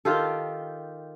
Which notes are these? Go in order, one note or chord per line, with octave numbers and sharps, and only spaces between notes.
D#3 F4 G4 A4